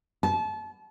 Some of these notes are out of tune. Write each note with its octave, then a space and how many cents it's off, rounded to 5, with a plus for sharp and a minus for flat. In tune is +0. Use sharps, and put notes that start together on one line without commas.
A5 -30